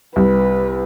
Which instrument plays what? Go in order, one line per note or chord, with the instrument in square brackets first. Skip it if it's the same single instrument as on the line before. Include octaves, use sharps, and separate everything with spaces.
[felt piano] C2 [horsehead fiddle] B4